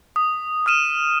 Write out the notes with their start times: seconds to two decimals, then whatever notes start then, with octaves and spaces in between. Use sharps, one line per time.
0.16 D#6
0.66 D#6 F6 D#7 E7